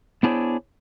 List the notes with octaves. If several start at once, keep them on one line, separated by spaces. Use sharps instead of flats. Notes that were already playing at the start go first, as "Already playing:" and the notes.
B3 D4 E4 G#4 C5 C#5